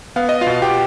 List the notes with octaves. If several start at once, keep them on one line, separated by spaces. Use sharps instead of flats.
B3 F5
D#5
F4 F5
B2
G4 G5